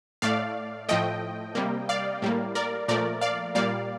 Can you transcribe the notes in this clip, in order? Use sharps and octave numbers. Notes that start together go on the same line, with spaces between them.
A2 A3 D5 F5
A2 F3 A3 D#5 G5
C3 G3 A#3
D5 F5
A2 G3 A#3
A#4 D5
A#2 F3 A3 A#4 D5
D5 F5
A#2 G3 A#3 D5 F5